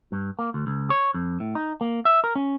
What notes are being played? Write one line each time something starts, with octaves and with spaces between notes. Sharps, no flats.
G2
A#3
D2
C#2
C#5
F2
A2
D#4
A#3
E5
A#4
C#4